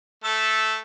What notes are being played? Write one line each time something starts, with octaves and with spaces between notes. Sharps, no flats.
A3 A4